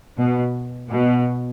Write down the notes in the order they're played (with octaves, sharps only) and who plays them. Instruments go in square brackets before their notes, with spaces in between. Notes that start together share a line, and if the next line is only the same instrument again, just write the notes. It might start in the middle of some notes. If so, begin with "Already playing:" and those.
[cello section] B2
B2